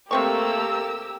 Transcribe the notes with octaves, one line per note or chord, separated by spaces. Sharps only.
C3 A3 A#3 C4 G4 A#4 C#6 E6